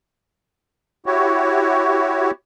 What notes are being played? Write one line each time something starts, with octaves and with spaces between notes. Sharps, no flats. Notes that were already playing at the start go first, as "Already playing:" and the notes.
E4 F#4 G4 C#5